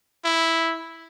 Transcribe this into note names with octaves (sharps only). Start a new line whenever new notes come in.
E4